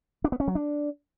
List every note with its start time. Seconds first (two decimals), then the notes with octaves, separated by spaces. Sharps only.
0.24 D4
0.32 B3
0.40 C#4
0.48 F#3
0.55 D4